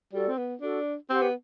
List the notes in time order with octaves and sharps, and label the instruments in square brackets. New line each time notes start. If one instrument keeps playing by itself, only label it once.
[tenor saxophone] G3 [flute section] F#4 A4 D5
[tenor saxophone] C4
B3
[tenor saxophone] D4 [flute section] F#4 A4 D5
[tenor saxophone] C4 [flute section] G4 C5 F#5
[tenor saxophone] B3